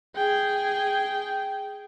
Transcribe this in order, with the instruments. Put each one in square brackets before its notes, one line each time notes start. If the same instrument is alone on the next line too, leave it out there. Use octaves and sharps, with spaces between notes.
[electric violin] G#4 G5